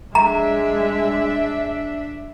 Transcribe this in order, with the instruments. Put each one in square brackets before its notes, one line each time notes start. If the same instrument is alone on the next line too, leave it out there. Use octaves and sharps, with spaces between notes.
[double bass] G#3 [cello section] D4 E5 [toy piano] A#5